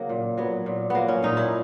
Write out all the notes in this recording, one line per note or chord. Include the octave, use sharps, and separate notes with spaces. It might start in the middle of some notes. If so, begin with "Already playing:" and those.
Already playing: C#3 F#3 A#3
A#2
F#3 B3
A#2
F#3 A#3 B3
C#4
A#2 D#4
E4